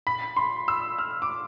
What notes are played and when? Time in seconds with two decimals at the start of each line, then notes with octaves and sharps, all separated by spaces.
0.07 B5
0.37 C6
0.68 E6
0.98 F6
1.22 D6